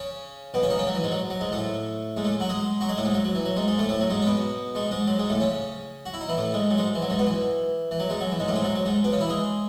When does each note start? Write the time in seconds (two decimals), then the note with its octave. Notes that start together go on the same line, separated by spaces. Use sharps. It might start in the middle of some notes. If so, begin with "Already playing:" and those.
Already playing: C#3 C#4
0.54 B2 B3
0.63 C#3 C#4
0.70 D#3 D#4
0.79 C#3 C#4
0.87 F#3
0.95 E3
1.03 G#2 G#3
1.12 F#3
1.30 F#3
1.41 G#2 G#3
1.52 A2 A3
2.17 G#2 G#3
2.24 A2 A3
2.40 F#3 F#4
2.49 G#3 G#4
2.81 F#3 F#4
2.89 G#3 G#4
2.97 A2 A3
3.05 G#2 G#3
3.14 F#3
3.24 F#3
3.35 E3
3.45 F#3
3.56 G#2 G#3
3.68 G#2 G#3
3.79 A2 A3
3.89 A2 A3
4.00 F#3
4.10 G#2 G#3
4.22 C#4
4.27 B2 B3
4.75 G#2 G#3
4.91 G#2 G#3
5.07 F#3
5.19 G#2 G#3
5.30 A2 A3
5.40 C#3 C#4
6.06 F#4
6.14 E4
6.21 D#4
6.29 E3 E4
6.37 A2 A3
6.54 G#2 G#3
6.71 F#3
6.78 G#2 G#3
6.95 E3
7.02 F#3
7.10 G#2 G#3
7.19 B2 B3
7.27 E3
7.91 E3
8.00 F#3
8.10 G#2 G#3
8.20 F#3
8.32 E3
8.40 G#2 G#3
8.48 A2 A3
8.56 G#2 G#3
8.64 F#3
8.75 F#3
8.86 G#2 G#3
9.04 B2 B3
9.13 C#3 C#4
9.20 E3 E4
9.29 G#3 G#4